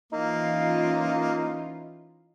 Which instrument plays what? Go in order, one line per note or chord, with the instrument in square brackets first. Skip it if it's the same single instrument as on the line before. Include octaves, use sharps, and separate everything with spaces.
[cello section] E3 C#4 F4 [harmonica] A#3 [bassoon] D#4